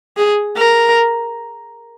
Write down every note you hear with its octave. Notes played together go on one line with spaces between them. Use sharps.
G#4
A#4